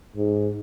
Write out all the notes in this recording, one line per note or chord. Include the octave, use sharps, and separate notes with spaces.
G#2